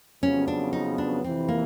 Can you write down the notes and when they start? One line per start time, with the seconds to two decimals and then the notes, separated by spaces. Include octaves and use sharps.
0.22 F2 C#3 F#3 B3 C#4
0.48 D4
0.73 D#4
0.98 D4
1.24 F2 C3 E3 C4
1.48 A#3